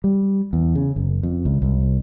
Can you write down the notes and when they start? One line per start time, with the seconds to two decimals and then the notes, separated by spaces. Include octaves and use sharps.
0.04 G3
0.53 E2
0.75 C#3
0.96 F#1
1.23 F2
1.45 C#2
1.62 C2